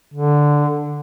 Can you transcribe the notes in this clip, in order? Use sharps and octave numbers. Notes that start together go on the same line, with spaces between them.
D3